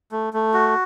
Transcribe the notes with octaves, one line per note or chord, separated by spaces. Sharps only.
A3
A3
F#4